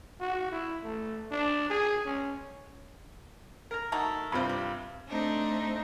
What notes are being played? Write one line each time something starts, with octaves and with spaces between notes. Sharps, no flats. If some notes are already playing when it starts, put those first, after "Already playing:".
F#4
E4
A3
D4
G#4
C#4
A#4 A#5
A3 D#4 F#4
G2 C3 F4 B4 C5
G4
A3 C4 D4 D#4